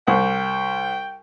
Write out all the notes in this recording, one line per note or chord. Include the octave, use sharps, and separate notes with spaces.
C2 G5